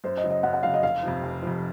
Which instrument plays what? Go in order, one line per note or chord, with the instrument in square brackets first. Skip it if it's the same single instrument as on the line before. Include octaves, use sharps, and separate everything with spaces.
[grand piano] F#2 [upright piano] C5
[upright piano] D#5
[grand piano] C#3 F#3
[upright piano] D#5
[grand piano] F#2 [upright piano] F#5
[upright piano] F#5
[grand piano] C#3 F#3 [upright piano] F5
[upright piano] D#5
[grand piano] F1 [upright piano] F5
[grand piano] F2 C3 F3
F1
F2 C3 F3